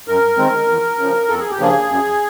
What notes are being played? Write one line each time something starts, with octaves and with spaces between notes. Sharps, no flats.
F#2 A#4
D#3 G#3 C4
E2
C#3 F3
F2 A4
G#4
G4
C#3 F3 A#3 D4 G#4
F#2